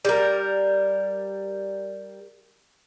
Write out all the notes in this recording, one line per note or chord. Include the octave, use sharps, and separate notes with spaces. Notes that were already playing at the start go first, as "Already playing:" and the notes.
G3 A#4